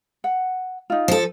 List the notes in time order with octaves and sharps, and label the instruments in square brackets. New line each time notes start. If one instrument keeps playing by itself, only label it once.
[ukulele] F#5
D#4 F4
[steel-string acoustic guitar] F3 A4